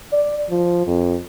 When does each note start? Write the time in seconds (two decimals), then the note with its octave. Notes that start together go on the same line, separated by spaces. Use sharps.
0.12 D5
0.50 F3
0.87 F2